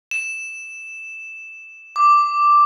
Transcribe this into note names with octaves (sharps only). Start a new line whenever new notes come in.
E7
D6